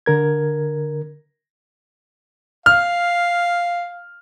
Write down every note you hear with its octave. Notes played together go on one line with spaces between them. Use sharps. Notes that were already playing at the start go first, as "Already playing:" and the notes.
D3 A#4 G#6
F5 F6